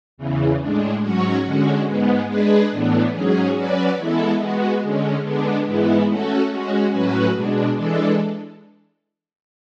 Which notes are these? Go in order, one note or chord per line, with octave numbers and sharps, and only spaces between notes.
E2 C#3 E3
A2 G#3 D4
G#2 F#3 C#4 F#4 C#5
D3 G#3 C#4 F#4
G#2 G#3 B3
G#3 D4 G#4 B4
A2 E3 B3 D4
G#2 F#3 C#4 G#4
F#3 C#4 F#4 B4 D5
E3 G#3 B3 E4 A4
G#3 B3 F#4
D3 G#3 C#4
D3 G#3 B3 D4
G#2 E3 G#3 B3 E4
A3 C#4 F#4 A4
G#3 C#4 F#4
A2 F#3 C#4 F#4 B4
B2 G#3 D4
E3 G#3 D4 A4